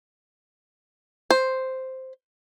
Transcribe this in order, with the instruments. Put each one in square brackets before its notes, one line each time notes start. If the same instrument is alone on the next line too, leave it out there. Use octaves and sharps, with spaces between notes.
[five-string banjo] C5